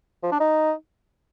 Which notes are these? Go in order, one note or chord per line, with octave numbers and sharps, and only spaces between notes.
F3
D4
D#4